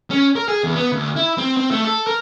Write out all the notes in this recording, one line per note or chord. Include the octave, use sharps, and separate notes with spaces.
C#4
A#4
G#4
E2
B3
D2
E4
C4
C4
A3
A4
A#4